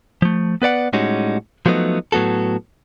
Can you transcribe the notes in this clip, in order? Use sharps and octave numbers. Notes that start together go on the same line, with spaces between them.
F3 A3
B3 B4 D5 F#5
A2 G3 G#3 C#4 D#4 F#4
F3 F#3 A3 B3 D#4
A2 F#3 B3 F#4 A4